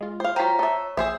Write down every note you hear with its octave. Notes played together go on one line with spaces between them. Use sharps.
G#3 F4
C5 F5
F#3 F4 C5 G5 A#5 B6
A4 C#5 E5
A#1 G#4 C5 E5 E7